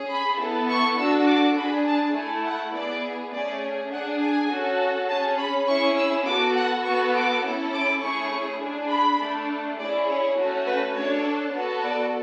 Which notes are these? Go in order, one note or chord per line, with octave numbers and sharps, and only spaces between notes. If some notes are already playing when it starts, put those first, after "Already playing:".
Already playing: C#4 G#4
B5
B3 E4 A4
C#6
D4 F#4 A4 E6
D6
D4 G#4 B5
A5
A3 E4 A4 G#5
F#5
B3 E4 G#4 D5
A3 C#4 G#4 D5
D4 G#4 F#5
G#5
C#4 F#4 A4
C#4 G#4 A5
B5
C#4 E4 G#4 C#6
E6
B3 F#4 A4 D6
F#5
B3 F#4 A4 C#6
D6
C#4 E4 A4
D6
A3 C#4 E4 G#4 C#6
D4 G#4
B5
A3 D4 A4
C#4 E4 G#4 D5
C#5
A3 C#4 F#4 A4
B4
D4 A4 C#5
B3 F#4 A4
D5